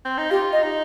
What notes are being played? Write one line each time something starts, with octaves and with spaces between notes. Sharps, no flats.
C4
D#4
F4 G4
D#5
D#4